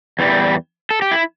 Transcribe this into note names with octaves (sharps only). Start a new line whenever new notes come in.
E2 E3 G3
A4
G4
E4